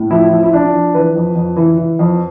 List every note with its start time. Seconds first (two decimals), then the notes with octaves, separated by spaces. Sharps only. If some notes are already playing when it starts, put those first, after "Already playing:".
Already playing: A2
0.11 F3 E4
0.31 F3
0.43 E4
0.53 F3 D4
0.74 F3
0.94 E3 B4
1.16 F2
1.36 F2
1.56 E3
1.77 E3
1.99 F2